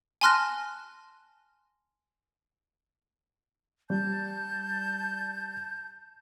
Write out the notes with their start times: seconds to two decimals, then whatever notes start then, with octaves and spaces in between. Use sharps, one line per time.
0.21 G#5 A5 C6 F6 F#6 A#6
3.90 G3 A5 G6